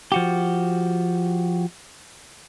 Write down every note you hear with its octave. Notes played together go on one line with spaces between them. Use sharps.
F3 F#4 G4